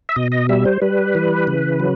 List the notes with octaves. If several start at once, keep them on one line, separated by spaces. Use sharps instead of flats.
E5
B2 D#5
D#5
G3 E5
C5
G3 B4
E3
C#3
F#3